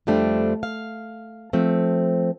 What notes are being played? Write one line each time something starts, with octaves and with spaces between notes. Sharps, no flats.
F2 F3 G3 A3 C4 D4
F5
F3 A3 C4